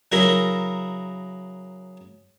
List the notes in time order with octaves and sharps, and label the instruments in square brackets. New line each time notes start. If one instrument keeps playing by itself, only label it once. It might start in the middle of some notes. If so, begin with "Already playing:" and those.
[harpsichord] C#3 F#3 E4 A#4 A#5